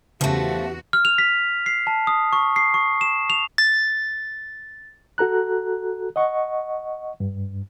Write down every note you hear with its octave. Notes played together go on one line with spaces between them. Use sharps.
E2 C#3 F3 A3 F#4 G4
F6
F7
B6
C7
A5
D#6
C#6
C7
C#6
E7
F7
A6
F#4 A4 A#5 F#6
D#5 F#5 C#6
G2